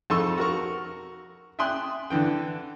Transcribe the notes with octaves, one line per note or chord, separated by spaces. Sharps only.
F2 D#4 A4 C6 C#6 E6
F#4 A#4 C#6
E5 G5 G#5 C6 D#6 F#6
D3 E3 G5